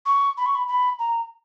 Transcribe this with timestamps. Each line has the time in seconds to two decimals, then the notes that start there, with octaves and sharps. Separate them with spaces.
0.06 C#6
0.37 B5
0.46 C#6
0.55 B5
0.68 B5
0.99 A#5